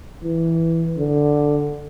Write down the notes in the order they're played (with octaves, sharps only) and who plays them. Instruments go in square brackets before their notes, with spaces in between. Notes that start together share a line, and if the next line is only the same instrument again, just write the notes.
[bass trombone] E3
D3